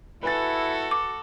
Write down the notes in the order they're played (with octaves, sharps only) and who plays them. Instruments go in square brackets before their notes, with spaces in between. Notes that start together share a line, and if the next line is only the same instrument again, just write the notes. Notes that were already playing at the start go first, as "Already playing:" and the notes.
[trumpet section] E4 [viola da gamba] F#4 A4 [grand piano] B4 G#5 A6
[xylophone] D6